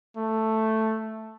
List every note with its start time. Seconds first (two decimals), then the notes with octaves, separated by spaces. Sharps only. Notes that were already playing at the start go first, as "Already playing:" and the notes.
0.17 A3